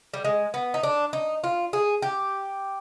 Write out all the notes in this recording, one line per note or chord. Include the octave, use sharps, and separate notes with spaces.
G3
G#3
B3
D#4
D4
D#4
F4
G#4
G4